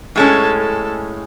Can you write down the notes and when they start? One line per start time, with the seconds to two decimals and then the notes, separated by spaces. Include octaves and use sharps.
0.16 A2 G#3 C#4 A4
0.58 A4